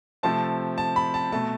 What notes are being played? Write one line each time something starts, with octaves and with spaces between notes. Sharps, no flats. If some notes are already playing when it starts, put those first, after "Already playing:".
C3 F3 A3 C4 A5
A5
B5
A5
B2 A3 A5